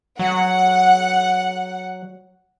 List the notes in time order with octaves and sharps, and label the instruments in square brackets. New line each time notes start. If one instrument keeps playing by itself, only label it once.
[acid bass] F#3 [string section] F#5